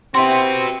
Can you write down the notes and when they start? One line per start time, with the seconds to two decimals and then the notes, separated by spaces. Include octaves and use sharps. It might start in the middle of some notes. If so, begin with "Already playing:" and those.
0.14 C4 E4 F#4 G4 B4 C6